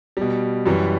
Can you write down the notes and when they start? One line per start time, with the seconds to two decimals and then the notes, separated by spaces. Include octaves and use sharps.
0.17 B2 G3
0.66 F#2 E3 G3